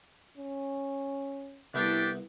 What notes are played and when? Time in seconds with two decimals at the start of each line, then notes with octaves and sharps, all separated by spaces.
0.37 C#4
1.74 C2 A3 B3 D4 E4 G4